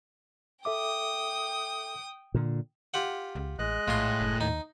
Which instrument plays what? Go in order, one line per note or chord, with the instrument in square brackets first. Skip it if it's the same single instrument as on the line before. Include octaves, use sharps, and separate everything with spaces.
[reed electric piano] A4 E5 D6 [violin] G5 D#6
[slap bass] A#2 D3
[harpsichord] F4 G4 F#5
[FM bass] C#2
[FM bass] A1 [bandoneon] G#3 D#5 F#6
[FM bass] A#1 [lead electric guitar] A2 [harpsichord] F4 C6
[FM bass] F#1
[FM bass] D#2 [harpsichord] D#4